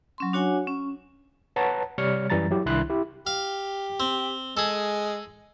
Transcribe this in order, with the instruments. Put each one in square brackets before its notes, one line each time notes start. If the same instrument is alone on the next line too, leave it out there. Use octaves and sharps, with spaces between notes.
[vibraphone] F#3 C#4 C6
D4 F#4 C#5 F#5 G#5
C#4
[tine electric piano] B4 C#5 F#5 A5 A#5
C3 G3 C#5 F6 C#7
F#2 E3 G3 A#5 A6
F#3 E4 G4
C2 D#3 D4 E4 C6 F#6
E4 G4
[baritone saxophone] G4 [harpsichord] F5
[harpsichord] C4
[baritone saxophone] G#3 [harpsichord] G#4 A4